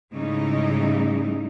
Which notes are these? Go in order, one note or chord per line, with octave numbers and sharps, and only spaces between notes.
G#2 C#3 G3 A3 D#4 E4